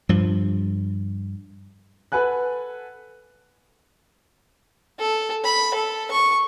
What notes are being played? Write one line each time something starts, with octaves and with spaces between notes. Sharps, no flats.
G2 F3
A4 B4 F#5 G#5 F#6
A4
B5
A4
C#6